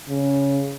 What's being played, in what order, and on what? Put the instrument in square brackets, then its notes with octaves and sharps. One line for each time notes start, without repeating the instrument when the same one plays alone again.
[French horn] C#3